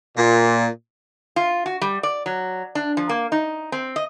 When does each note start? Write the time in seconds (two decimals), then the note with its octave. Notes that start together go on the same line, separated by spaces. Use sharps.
0.17 A#2
1.36 F4
1.66 F#4
1.81 G3
2.03 D5
2.26 F#3
2.75 D4
2.97 F3
3.09 A#3
3.32 D#4
3.72 C4
3.96 D#5